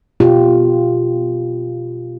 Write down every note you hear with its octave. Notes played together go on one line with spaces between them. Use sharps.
B2 F4 G4